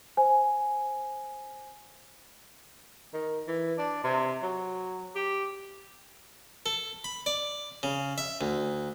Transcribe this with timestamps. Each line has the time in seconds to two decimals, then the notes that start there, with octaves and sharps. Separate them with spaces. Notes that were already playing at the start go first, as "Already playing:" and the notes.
0.17 C5 G#5
3.14 D#3
3.48 E3
3.78 D4
4.04 C3
4.42 F#3
5.15 G4
6.66 A4
7.04 B5
7.26 D5
7.83 C#3
8.18 E5
8.41 D2